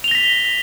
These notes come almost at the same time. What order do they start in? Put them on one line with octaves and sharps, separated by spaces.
F7 G7 A#6 B6